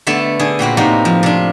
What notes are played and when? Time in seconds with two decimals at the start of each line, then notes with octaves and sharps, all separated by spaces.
0.07 D3 A3 B3 A4 E5
0.39 D3 G#4
0.59 A#2 C4 F#4 B4
0.77 A2 C3 A#3 D#4 F#4
1.05 F3
1.23 C3 D4